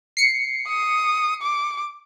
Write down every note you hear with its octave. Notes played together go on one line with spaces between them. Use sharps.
C7 C#7
D#6
D6